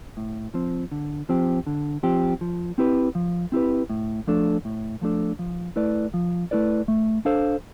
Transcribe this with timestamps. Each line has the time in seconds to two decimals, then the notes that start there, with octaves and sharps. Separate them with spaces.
0.17 A2
0.54 F3 C4
0.91 D3
1.29 F3 C4 G4
1.67 D3
2.03 F3 C4 G4
2.41 F3
2.78 C4 E4 G4 B4
3.15 F3
3.52 C4 E4 G4 B4
3.90 A2
4.27 F3 A3 D4 A4
4.65 A2
5.01 F3 A3 D4 A4
5.39 F3
5.76 A3 E4 B4 D5
6.14 F3
6.51 A3 E4 B4 D5
6.88 A3
7.25 D4 A4 C5 F5